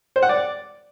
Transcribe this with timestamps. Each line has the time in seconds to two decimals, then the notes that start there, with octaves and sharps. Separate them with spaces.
0.16 C5
0.23 F#5
0.29 D5